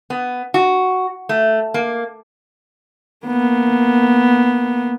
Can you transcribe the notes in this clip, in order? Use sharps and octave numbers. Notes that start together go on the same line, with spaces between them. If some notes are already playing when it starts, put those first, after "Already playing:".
B3
F#4
A3
A#3
A#3 B3